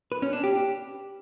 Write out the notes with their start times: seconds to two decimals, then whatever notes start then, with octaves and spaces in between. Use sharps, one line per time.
0.12 B4
0.22 C#4
0.33 D4
0.44 G4